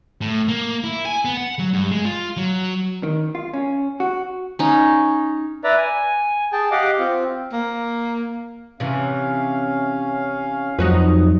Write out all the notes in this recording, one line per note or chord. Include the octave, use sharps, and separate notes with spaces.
A2
A#3
E4
G#5
B3
F#5
F#3
G2
G#3
F4
F#3
D#3
F4
C#4
F#4
C#4 D#4
B4 D5 E5 A#5
G#5
G#4 G5 A5
G4 D#5 F5 F#5 D6
C4 F4
A#3
C3 E3 C#4 F5
F2 F3 F#3 D#4 F#4 B4